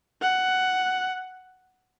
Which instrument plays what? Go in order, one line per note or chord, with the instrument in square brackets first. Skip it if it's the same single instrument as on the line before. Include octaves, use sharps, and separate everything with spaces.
[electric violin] F#5